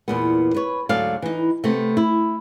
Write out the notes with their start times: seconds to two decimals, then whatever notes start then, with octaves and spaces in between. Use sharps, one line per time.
0.08 E2 A#2 B3
0.54 B4 C#5
0.89 D2 G#2 F#3 A4 D5 F5
1.22 E3 D#4
1.64 C3 A3 B3 C4
1.97 E4